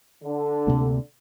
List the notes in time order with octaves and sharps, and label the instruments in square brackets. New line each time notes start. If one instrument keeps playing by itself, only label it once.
[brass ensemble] D3
[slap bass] D2 C3 G3 A#3